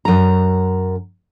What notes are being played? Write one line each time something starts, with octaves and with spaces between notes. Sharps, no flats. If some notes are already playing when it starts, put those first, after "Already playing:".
F#2 A#5